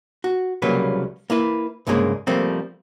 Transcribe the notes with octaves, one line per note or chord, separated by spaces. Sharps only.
F#4
C2 C#3 F#3 G3 A#3 B4
A#3 E4 B4
C2 G2 C#3 G#3 A#3 G#4
F3 G3 A3 A#3 C4